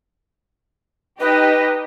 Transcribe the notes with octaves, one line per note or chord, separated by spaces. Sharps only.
D#4 G4 B4 D#5